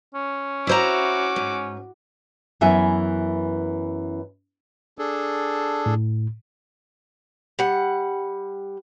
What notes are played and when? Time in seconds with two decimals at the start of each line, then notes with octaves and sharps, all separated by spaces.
0.15 C#4
0.67 E4 F#4 C5 A#5 D6
1.36 G#2
2.61 F#2 E3 B3 E5 G#5
4.99 D4 G#4 A4
5.86 A2
7.59 G3 F#5